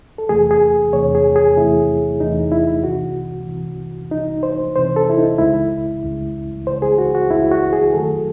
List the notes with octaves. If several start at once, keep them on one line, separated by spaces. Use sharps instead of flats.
A4
E2 C3 E3 A3 G#4
G#4
E2 C3 E3 A3 C#5
G#4
G#4
E2 C3 E3 A3 E4
E2 C3 E3 A3 D#4
E4
C2 C3 E3 F#4
C2 C3 E3
C2 C3 E3 D#4
C5
C2 C3 E3 C5
A4
E4
D#4
C#2 C#3 G#3 E4
C#2 C#3 G#3
C#2 C#3 G#3 C5
G#4
F#4
F#4
C#2 C#3 G#3 E4
F#4
G#4
F#2 D#3 F#3 A3 A4